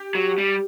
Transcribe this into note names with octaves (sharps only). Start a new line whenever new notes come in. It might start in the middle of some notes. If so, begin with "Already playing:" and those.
Already playing: G4
F#3
G3